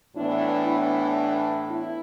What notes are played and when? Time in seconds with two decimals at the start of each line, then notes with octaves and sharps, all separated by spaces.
0.15 A2 E3 B3 D4 E4
0.67 D4
1.70 E4